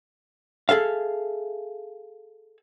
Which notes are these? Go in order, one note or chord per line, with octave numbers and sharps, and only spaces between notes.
G#4 A4 E5 F5